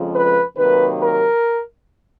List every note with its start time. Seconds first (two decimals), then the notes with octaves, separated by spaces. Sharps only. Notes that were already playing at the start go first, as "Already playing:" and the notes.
Already playing: F2 C#3 F3 G#3
0.14 B4
0.57 C3 D#3 F#3 A#3 B4
1.00 A#4